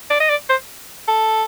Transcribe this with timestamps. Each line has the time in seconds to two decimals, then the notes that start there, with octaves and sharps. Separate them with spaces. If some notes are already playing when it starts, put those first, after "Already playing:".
0.10 D5
0.20 D#5
0.29 D5
0.50 C5
1.08 A4